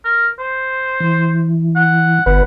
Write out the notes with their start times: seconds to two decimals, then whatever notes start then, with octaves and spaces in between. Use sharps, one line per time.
0.05 A#4
0.39 C5
1.00 E3
1.76 F#5
2.26 G1 B4 F#5